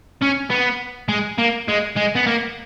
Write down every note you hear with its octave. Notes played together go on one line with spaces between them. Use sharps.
C#4
B3
G#3
A#3
G#3
G#3
B3
A#3